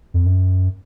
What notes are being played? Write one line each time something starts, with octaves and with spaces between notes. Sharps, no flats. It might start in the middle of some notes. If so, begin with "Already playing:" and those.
F2
F#2